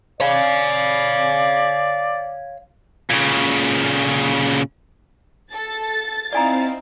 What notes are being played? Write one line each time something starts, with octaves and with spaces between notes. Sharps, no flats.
C#5 D5 F5
A#2 C#3
A4 A6
C4 D#4 E4 D5 F5 G#5 A#5